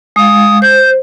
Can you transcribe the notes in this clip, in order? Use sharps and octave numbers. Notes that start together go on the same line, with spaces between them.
G#3 F5 D#6
C5 G6